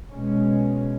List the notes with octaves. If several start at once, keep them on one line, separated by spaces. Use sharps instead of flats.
B2 G#3 C#4